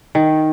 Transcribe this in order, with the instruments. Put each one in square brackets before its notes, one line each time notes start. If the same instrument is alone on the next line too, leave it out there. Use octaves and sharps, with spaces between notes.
[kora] D#3